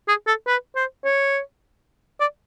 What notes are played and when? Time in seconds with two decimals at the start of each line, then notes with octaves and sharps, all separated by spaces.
0.08 G#4
0.27 A4
0.47 B4
0.76 C5
1.04 C#5
2.20 D5